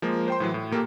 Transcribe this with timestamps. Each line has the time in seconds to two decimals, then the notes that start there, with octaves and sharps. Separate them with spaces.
0.02 F3 G#3 A#3
0.28 C5 G5 C6
0.40 A2 E3 F#3
0.54 A2
0.71 A#2 A#3 G4 A4